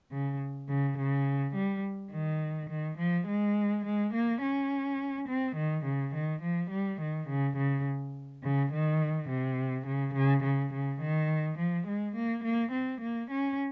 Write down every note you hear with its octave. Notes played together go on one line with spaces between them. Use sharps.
C#3
C#3
C#3
G3
D#3
D#3
F3
G#3
G#3
A#3
C#4
C4
D#3
C#3
D#3
F3
G3
D#3
C#3
C#3
C#3
D#3
C3
C#3
C#3
C#3
C#3
D#3
F3
G#3
A#3
A#3
C4
A#3
C#4